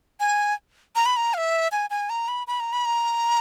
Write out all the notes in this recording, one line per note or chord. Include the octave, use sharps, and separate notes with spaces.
G#5
A#5
B5
A#5
F5
E5
G#5
G#5
A#5
B5
B5
A#5
B5
A#5